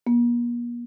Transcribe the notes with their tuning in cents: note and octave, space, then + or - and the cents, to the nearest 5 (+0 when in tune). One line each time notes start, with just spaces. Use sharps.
A#3 +45